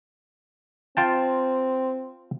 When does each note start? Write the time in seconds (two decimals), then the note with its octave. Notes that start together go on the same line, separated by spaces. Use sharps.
0.97 C4 F4 G5 A5